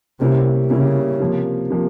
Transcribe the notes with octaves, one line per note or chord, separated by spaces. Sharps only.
C3 G3 A#3 C#4 E4
C#3 G3 A#3 C#4 E4
C3 F3 A#3
C3 F3 A#3